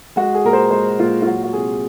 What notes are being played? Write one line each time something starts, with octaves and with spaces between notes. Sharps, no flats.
G#3 F#4
G#4
A#2 A#4
C5
G#3 C5
A#2 F4
F4
F#3 F#4
F#4
C3 G#4